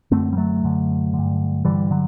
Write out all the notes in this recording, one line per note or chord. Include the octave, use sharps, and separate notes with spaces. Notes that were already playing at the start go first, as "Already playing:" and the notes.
F#2 D3 A3 C4
G3
F#3 A3
F#2 D3
D3
G2
G2 D3 E3 G3
D3 F#3